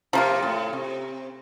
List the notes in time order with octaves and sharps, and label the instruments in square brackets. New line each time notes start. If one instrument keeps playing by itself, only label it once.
[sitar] C3 [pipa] F3 A#3 F4
[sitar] A2
C3